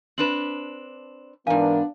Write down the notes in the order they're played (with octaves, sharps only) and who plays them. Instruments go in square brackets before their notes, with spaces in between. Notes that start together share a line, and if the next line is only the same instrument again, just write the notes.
[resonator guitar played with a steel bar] C4 D4 B4 [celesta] E7 F#7
[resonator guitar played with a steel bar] G#2 G#5 [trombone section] E3 A#4 [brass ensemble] B3 D4 [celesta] F5